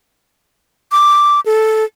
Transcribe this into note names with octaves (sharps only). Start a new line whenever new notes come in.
D6
A4